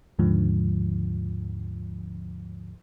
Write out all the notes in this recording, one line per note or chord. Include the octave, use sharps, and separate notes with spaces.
D#2 G#2 D3 F3